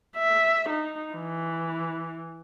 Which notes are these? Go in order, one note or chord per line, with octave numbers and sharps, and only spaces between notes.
E5
D#4
E3